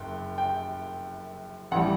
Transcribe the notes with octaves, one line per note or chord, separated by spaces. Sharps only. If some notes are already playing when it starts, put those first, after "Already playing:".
Already playing: F#1 F#2 G5
G5
A1 E3 G3 F#5